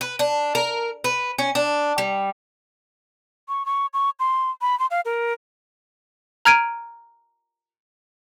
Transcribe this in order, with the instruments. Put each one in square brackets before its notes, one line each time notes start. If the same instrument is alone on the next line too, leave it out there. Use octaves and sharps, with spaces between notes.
[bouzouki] B4
D4
A#4
B4
C#4
D4
G3
[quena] C#6
C#6
C#6
C6
B5
C6
F5
A#4
[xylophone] A#5 F6 G#6 D7 D#7